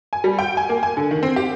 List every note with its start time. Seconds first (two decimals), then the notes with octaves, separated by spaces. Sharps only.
0.13 G#5
0.24 G3
0.39 G5
0.57 G#5
0.69 A#3
0.83 G#5
0.97 D3
1.11 D#3
1.23 C4
1.36 G4